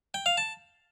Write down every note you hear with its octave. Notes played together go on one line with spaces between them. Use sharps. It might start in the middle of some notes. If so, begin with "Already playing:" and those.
G5
F5
A5